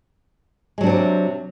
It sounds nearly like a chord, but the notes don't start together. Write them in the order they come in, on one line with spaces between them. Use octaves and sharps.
G#3 F#3 D4 C4 C3